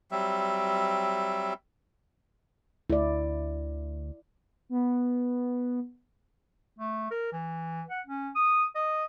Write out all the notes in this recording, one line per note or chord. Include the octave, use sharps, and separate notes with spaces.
F#3 G3 C4 E5
D2 E4 D5
B3
A3
A#4
E3
F#5
C#4
D#6
D#5